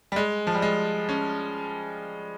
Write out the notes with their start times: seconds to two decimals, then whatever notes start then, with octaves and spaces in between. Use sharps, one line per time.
0.12 G3
0.16 G#3
0.47 F3
0.55 G3
0.62 G#3
1.09 C#4